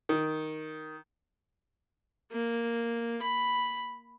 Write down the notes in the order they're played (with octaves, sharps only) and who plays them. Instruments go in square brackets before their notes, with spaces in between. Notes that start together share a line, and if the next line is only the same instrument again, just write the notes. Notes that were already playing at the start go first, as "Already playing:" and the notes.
[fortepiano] D#3
[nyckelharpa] A#3
B5